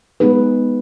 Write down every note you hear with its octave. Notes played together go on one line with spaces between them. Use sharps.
G#3 B3 D#4 G#4 B4